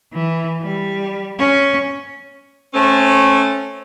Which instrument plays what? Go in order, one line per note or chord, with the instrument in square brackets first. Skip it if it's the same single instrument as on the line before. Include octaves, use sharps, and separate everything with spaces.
[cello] E3
G3
C#4
[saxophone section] A3 C4 C#4